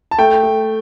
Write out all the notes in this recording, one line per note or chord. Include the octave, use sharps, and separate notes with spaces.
A5
A3 G5
A3